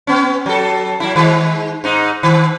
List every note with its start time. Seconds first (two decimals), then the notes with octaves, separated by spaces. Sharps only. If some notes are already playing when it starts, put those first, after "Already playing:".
0.07 B3 C#4
0.46 F#3 A4
1.00 F#3 E4
1.16 D#3 G#3
1.84 G#2 D#4
2.23 D#3